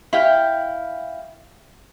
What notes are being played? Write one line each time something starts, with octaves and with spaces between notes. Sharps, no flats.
E4 F5 G5